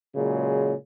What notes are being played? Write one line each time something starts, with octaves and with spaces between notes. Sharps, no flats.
A#2 C#3 F#3 G#3